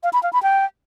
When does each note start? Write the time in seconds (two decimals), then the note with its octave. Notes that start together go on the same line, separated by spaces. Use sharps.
0.03 F5
0.13 B5
0.23 F5
0.33 B5
0.43 G5